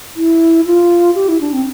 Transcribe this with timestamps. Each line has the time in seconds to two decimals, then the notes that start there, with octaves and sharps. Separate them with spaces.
0.16 E4
0.66 F4
1.15 G4
1.29 E4
1.41 D4
1.53 C4